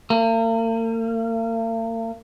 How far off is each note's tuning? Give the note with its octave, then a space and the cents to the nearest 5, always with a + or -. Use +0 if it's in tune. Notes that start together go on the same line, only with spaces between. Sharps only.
A#3 -45